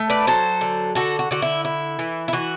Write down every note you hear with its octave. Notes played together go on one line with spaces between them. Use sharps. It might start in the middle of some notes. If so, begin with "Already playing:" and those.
Already playing: A3
B4 D5
F#3 A4 C5
D3
D3 F#4 A4
F#4
D3 F#4
E4
E4
E3
E4
E3 F#4